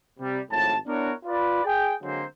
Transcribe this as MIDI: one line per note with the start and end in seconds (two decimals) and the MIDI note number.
0.19 0.39 48
0.19 0.39 55
0.51 0.75 32
0.51 0.75 45
0.51 0.75 53
0.51 0.75 81
0.86 1.12 59
0.86 1.12 62
0.86 1.12 64
0.86 1.12 66
0.86 1.12 70
0.86 1.12 73
1.25 1.64 65
1.25 1.64 71
1.25 1.64 74
1.65 1.93 68
1.65 1.93 79
2.02 2.23 50
2.02 2.23 54
2.02 2.23 56
2.02 2.23 58
2.02 2.23 60
2.02 2.23 72